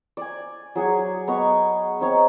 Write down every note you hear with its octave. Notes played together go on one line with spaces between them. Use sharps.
D5 G#5
F#3 G#4 F#5 G#5
B3 D#5 A#5 C#6
C4 D#4 C#5